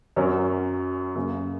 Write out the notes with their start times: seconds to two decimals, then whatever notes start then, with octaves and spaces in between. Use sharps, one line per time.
0.16 F#2 F#3 C#4 A#4
1.15 F#2 C#3 A#3